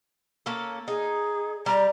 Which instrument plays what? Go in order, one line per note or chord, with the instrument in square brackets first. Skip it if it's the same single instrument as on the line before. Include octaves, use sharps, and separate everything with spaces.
[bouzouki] A#3 C#4 A4
[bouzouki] D#4 [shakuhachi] G#4
[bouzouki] G3 [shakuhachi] A#5